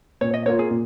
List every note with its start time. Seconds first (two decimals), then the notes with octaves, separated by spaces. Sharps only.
0.21 A#2 C#5
0.34 D#5
0.46 A#3 F4 C#5
0.59 G#4
0.71 A#2